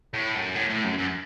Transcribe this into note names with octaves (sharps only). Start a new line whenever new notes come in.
A2
F#2
A2
A2
F#2
F#2